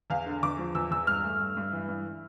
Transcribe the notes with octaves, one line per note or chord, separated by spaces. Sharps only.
E2 F5
D3
E2 D6
F3
E2 E6
E2 E6
G2 F6
A3
G2
G2
E3
G2